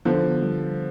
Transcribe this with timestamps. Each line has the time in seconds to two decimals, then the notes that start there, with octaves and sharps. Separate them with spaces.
0.05 D3 F3 B3
0.42 G3